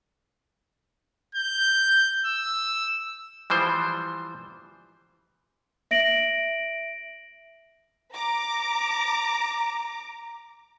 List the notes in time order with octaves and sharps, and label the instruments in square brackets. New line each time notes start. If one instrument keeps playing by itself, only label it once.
[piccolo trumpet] G6
E6
[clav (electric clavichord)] E3 F3 G3 C5
[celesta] E5 A#6 D7 F#7
[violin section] A#5 D6